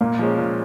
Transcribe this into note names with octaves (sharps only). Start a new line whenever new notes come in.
A#2 A#3
F3 G#3 C#4
A#2